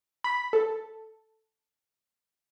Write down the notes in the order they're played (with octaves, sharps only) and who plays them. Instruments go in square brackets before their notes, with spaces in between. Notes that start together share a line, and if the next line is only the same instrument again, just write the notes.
[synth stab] B5
A4